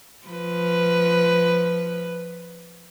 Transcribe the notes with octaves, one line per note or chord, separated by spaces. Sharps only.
F3 B4